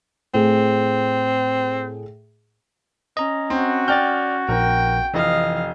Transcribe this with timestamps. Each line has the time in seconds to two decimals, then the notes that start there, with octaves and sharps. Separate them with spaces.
0.34 A2 C4 G#4
3.17 C#4 D#5 A#5
3.50 C4 F#4
3.88 D5 G5 F6 G6 A6
4.49 A#1 A#4 G5
5.14 F1 E3 D#5 F5